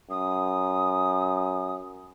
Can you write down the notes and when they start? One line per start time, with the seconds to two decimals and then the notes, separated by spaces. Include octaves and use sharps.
0.10 F#2 D#6